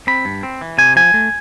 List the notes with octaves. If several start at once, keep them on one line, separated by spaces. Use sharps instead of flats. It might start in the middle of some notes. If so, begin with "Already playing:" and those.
C4 B5
G2
C4
E3
C3 G#5
F3 G#5
A3